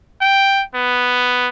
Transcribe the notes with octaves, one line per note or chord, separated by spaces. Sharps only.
G5
B3